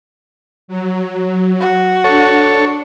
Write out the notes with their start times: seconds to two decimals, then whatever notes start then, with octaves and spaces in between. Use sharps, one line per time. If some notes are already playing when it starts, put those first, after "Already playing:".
0.68 F#3
1.60 F#4
2.04 D4 A4 C#5